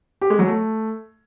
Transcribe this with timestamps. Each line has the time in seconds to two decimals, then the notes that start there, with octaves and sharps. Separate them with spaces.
0.22 G4
0.30 G#3
0.39 F#3
0.48 A3